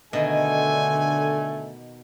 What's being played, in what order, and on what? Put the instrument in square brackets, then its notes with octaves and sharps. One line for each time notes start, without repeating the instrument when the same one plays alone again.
[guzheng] B2 D#3 [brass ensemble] D3 G#5 [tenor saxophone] A3